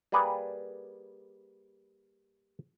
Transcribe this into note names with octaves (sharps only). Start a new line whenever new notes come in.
G3 A#3 G#4 B4 D5